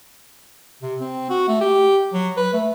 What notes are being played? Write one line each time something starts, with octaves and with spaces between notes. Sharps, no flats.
C3
C4
F#4
A3
G4
F#3
B4
A3